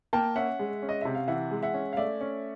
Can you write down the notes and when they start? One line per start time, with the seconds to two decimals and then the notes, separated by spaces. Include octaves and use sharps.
0.13 A#3 G5 A5
0.36 C#4 E5 F#5
0.59 G#3
0.82 C#4
0.89 D#5
1.01 C3 E5
1.15 F5
1.28 E3 E5 F#5
1.51 G#3
1.63 E5 F#5
1.74 C#4
1.93 F5
1.97 A3 D5 E5
2.21 C#4